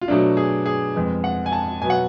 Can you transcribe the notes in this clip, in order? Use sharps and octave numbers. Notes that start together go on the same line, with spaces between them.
F4
B2 F#3 A3 D4
G#4
G#4
F2 F3 G#3 B3
F#5
G#5
A5
B2 F#3 B3 G#5
F#5